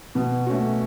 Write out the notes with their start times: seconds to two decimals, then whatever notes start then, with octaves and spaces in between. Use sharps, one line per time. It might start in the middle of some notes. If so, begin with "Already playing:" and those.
0.15 B2
0.47 A3 C#4 F#4